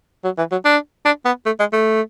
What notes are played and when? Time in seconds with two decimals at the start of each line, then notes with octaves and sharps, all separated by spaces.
0.24 F#3
0.38 E3
0.51 F#3
0.65 D4
1.05 D4
1.25 B3
1.46 A3
1.59 G#3
1.73 A3